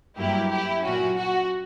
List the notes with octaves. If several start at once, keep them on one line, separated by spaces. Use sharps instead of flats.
G2 F#3 A#3 E4 G4
E4 G4
A#2 F#3 C#4 F#4
F#4